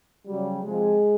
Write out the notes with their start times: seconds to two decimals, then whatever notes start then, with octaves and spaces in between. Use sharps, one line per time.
0.26 C#3 F#3 G3
0.63 C3 F3 G#3